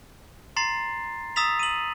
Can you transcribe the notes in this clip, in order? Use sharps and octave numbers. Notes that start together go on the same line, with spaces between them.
A#5 C6 A6 C7
A#5 D#6 E6 A6 B6 F7
D#7 F#7